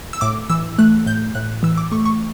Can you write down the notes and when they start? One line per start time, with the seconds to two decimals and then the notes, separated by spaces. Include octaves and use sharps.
0.13 E6
0.21 A2 D6
0.50 E3 E6
0.79 A3 F#6
1.06 A2 G6
1.35 A2 F#6
1.63 E3 E6
1.78 D6
1.92 A3 C#6
2.06 C#6